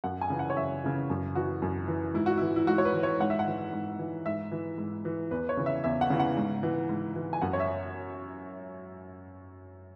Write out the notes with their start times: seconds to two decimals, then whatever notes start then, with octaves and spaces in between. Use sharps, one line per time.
0.04 F#2 F#5
0.21 G#5
0.30 C#3 E3
0.39 F#5
0.50 C#5
0.57 F#2 E5
0.84 C#3 E3
1.10 F#2
1.35 E3 F#4
1.62 F#2
1.88 E3
2.15 G#2 E4
2.26 F#4
2.38 E3 E4
2.56 E4
2.67 G#2 F#4
2.78 C#5
2.85 B4
2.94 E3
3.03 C#5
3.20 G#2 F#5
3.30 E5
3.39 F#5
3.47 E3
3.73 G#2
3.99 E3
4.26 G#2 E5
4.52 E3
4.78 G#2
5.05 E3
5.31 E2 B4
5.49 C#5
5.57 C#3 E3
5.66 E5
5.84 E2 E5
6.01 F#5
6.10 C#3 E3
6.20 F#5
6.37 G#2
6.63 E3
6.89 G#2
7.16 E3
7.33 G#5
7.42 F#2 F#5
7.53 C#5
7.60 E5